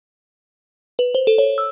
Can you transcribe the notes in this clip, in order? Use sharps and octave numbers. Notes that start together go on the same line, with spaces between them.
B4
C5
A4
C#5
E6